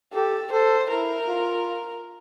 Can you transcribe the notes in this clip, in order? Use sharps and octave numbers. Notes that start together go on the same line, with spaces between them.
G4 A4
A4 C5
E4 A#4
F4